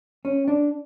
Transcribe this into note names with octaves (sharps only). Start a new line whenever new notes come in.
C#4
D4